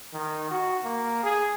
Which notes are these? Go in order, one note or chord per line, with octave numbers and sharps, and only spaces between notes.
D#3
F#4
A#3
G#4